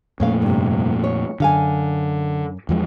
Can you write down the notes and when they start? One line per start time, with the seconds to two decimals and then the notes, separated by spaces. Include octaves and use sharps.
0.20 F2 A#2 A3 C#4 F5
0.42 G2 C3
1.04 C#5
1.40 F#2 D3 F5 G#5
2.69 E2 F3 G#3